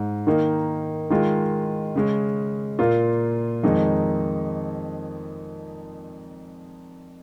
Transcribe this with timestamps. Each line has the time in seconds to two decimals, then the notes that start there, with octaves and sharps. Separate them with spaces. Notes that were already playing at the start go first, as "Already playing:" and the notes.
Already playing: G#2 G#3
0.27 D#3 A#3 D#4
1.10 D#3 G#3 F4
1.95 C#3 G#3 C#4
2.79 A#2 A#3 F4
3.63 F2 D#3 G#3 D#4